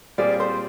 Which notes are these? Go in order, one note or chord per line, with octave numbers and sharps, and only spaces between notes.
A#2 G3 C4 F4 G#4 D5
C5